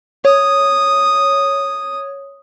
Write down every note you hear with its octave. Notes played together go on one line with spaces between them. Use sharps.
C#5 D#6